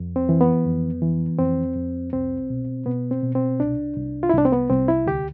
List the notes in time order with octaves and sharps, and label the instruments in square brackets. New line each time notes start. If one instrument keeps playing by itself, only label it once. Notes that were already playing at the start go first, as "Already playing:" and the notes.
Already playing: [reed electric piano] F2
C4
E3
B3
F2
E3
F2 C4
F2
C2 C4
B2
B2 B3
C4
B2
C4
C2 D4
C2
F4
E4
C2 D4
C4
B3
C2 C4
E4
D2 G4